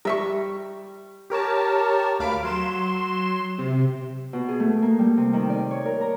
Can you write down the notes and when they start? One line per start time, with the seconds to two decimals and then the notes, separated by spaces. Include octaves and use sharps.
0.05 G3 A#4 E5 C#6
1.30 G4 A#4 C#5 A5
2.19 D2 A3 F5 B5 D7
2.43 F#3 C6 E7
3.58 C3
4.33 B2
4.48 G#4
4.60 A3
4.82 A#3
4.99 G3
5.17 C3
5.33 D#3
5.50 D5
5.71 C#5
5.86 A#4
6.01 A#5